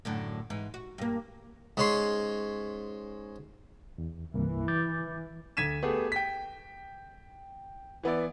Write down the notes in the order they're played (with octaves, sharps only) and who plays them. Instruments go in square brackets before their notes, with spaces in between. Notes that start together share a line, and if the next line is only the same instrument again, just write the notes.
[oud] F#2 A2 D3
G#2 E3
F#4
G2 A#3
[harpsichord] G#2 C#4 C6
[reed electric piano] E2
[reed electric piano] C2 G2 A#3 [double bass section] E3
[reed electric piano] D6 G6 A6
[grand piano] D2 G#6 B6 D#7 E7
A3 B3 G4 G#4
G5 B6
E3 B3 E4 D5